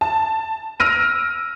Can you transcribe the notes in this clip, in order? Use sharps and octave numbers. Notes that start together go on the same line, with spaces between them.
A5
E6 F6 A#6 D7 D#7